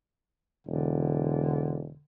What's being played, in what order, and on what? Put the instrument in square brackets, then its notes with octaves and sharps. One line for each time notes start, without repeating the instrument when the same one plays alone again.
[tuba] E1 [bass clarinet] D3